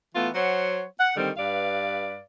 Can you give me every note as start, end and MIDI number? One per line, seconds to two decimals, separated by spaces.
0.14 0.28 52
0.14 0.28 57
0.14 0.28 59
0.14 0.28 65
0.33 0.82 54
0.33 0.82 72
0.33 0.82 73
0.33 0.82 78
0.98 1.14 78
1.15 1.29 50
1.15 1.29 51
1.15 1.29 55
1.15 1.29 60
1.37 2.19 43
1.37 2.19 71
1.37 2.19 74
1.37 2.19 77